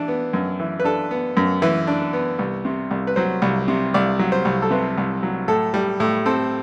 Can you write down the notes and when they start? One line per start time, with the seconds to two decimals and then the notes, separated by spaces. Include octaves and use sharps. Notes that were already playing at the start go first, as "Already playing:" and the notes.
Already playing: E3 D4
0.08 B3
0.33 F#2
0.60 E3
0.80 B4
0.84 D4 A4
1.11 B3
1.37 F#2
1.62 E3 B4
1.87 D4
2.13 B3
2.39 C2
2.65 C3
2.91 C2
3.07 B4
3.16 F#3 C5
3.42 C2
3.68 C3
3.94 C2 D5
4.19 F#3
4.32 C5
4.45 C2
4.62 A4
4.71 C3 B4
4.98 C2
5.23 F#3
5.48 A2 A4
5.74 G3
6.00 A2
6.26 C4 A4